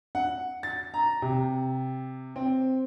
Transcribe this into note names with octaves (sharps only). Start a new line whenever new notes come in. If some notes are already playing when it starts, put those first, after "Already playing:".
F#5
A6
A#5
C3
C4